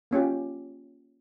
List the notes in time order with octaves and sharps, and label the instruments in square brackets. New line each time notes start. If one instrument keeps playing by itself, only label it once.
[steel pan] A#3 C#4 F4 G4